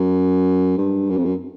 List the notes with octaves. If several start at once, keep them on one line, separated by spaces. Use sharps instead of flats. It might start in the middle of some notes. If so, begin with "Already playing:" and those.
Already playing: F#2
G2
F#2
F2
F#2